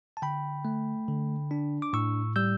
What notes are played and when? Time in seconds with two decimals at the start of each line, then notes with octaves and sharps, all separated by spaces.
0.17 A5
0.22 D3 G5 B5
0.65 A3
1.08 D3
1.51 D4
1.82 D6
1.93 A2 C#6 E6
2.36 G3 E6 G6